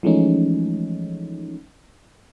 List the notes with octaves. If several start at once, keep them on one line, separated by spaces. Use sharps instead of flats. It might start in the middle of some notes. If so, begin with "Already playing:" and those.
E3 F3 G#3 A3 C#4 D#4